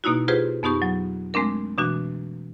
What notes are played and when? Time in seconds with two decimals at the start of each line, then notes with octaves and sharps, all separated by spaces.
0.04 B2 A#3 D#4 E4 F#4
0.28 F4 G4 G#4 B4 C5
0.63 F2 B3 D#4 G4 C#6
0.82 F#3
1.34 G#3 A3 C4 D4 A#4
1.78 B2 E3 D4 F#4